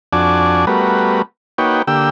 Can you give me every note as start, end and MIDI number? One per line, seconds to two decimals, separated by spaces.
0.13 0.65 41
0.13 0.65 62
0.13 0.65 66
0.13 0.65 74
0.13 0.65 80
0.13 0.65 81
0.67 1.22 55
0.67 1.22 57
0.67 1.22 59
0.67 1.22 66
0.67 1.22 70
0.67 1.22 71
1.58 1.82 58
1.58 1.82 63
1.58 1.82 66
1.58 1.82 71
1.58 1.82 73
1.58 1.82 79
1.87 2.10 50
1.87 2.10 58
1.87 2.10 67
1.87 2.10 79
1.87 2.10 88